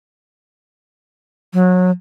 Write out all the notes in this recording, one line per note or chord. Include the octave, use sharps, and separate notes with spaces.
F#3